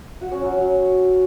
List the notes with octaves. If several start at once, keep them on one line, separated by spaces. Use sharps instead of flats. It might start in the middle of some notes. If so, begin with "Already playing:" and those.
F#4
C#4
F#3
F#3